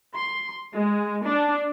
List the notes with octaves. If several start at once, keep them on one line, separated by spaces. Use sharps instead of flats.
C6
G#3
D4